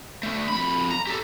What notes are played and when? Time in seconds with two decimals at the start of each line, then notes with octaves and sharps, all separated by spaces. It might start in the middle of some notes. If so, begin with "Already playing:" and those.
0.23 D3 A3
0.48 F2 B5
0.91 A#5
1.07 G4 A4